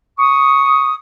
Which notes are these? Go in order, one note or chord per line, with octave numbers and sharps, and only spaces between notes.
C#6 D#6